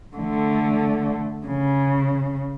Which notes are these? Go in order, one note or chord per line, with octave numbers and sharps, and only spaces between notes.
D3 A3
C#3